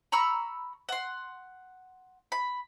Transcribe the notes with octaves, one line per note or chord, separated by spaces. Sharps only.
A#5 B5 C#6 E6
F#5 C6
B5